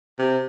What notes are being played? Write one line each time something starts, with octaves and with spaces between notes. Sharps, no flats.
C3